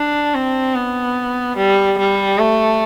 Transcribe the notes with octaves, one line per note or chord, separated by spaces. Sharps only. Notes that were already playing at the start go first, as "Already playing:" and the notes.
Already playing: D4
C4
B3
G3
G3
A3